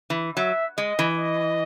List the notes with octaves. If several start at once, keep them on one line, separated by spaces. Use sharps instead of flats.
E3
F#3 E5
G#3 D#5
E3
D#5